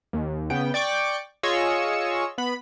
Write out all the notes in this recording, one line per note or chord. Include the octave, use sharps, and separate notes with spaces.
D#2
C#3 B3 G5
D5 G5 C#6 D6
F4 G#4 C#5 D#5 C#6 E6
B3 B5